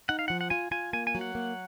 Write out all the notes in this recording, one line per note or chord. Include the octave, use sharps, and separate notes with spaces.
D#4 F#5
F5
F3 F#5
F#5
F4 G#5
F4 G#5
A#3 G#5
G#5
F#3
F#5
A#3